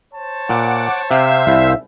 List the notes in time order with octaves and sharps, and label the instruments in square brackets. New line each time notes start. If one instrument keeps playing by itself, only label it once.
[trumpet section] C5 C#5 A5
[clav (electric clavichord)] A#2 [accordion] F#5 D6
[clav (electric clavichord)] C3 [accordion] C5 F5 E6 [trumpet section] E5
[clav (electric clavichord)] C2